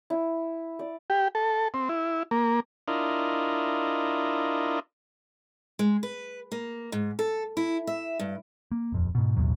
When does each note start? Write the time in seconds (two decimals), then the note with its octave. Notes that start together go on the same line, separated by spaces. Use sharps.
0.10 E4
0.79 D5
1.10 G4
1.35 A4
1.74 C4
1.89 E4
2.31 A#3
2.88 D4 E4 F4 A#4 D#5
5.79 G#3
6.03 B4
6.52 A#3
6.92 G#2
7.19 A4
7.57 E4
7.87 E5
8.19 G2
8.72 A#3
8.92 D#1 F2
9.15 G#2 B2
9.36 A1 D#2 B2 F#3